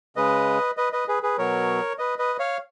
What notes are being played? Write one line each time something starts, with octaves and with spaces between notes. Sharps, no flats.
C#3 G#3 B4 D#5
B4 D#5
B4 D#5
G#4 B4
G#4 B4
B2 F#3 A#4 C#5
B4 D#5
B4 D#5
C#5 F5